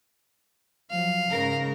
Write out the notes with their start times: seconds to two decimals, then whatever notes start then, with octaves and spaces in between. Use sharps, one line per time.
0.91 F3 F#3 F5
1.30 G#2 C#3 A#4